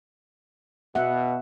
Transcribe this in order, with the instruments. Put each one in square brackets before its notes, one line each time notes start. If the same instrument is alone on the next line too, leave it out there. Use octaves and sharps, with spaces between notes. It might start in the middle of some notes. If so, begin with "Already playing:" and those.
[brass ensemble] B2 [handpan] B3 E5 F#5